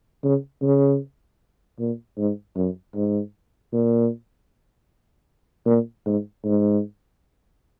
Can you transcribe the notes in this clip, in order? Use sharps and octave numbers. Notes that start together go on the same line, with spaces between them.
C#3
C#3
A#2
G#2
F#2
G#2
A#2
A#2
G#2
G#2